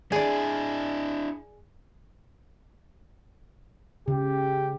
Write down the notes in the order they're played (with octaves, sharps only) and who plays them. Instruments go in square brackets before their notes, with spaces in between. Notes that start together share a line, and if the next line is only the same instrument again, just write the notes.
[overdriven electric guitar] D4 E4 [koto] G#4 D5
[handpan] C#3 [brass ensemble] G4